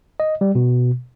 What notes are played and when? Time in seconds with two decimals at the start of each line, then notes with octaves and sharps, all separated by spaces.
0.20 D#5
0.41 G3
0.55 B2